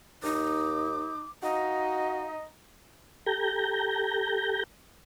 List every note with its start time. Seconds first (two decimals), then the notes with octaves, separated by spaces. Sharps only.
0.23 D#2 D#4 D6
1.43 D#4 F#4 D#5 F5
3.26 G4 A4 A#5 G6